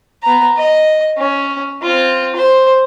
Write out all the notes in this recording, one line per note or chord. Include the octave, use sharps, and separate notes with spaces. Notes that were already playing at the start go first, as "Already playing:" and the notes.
B3 A#5
D#5
C#4
C4 F4
C5